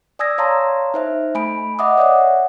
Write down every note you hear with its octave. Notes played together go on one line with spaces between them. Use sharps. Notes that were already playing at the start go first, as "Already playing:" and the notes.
D5 G#5 D#6 E6 G#6 A#6
C#5 F5 A5 A#5 C6
D#4 C5 E5
A3 G#5 B5 D7
D#5 E5 F#5 D6 D#6
C#5 D5 E5 F#5